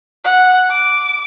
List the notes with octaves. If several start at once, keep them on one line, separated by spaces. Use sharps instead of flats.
F#5
D6